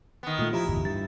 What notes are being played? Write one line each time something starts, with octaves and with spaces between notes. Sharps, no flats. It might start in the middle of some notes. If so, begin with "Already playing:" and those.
D#3 B3
A#2 A3 F4
F3 E4 G4 A#5
D1 G1 E2
G2 A6